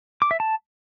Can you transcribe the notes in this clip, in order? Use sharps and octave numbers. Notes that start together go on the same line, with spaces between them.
D6
E5
A5